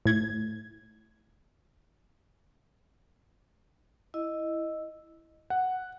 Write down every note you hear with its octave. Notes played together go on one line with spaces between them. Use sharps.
A2 G#6
E4 D#5
F#5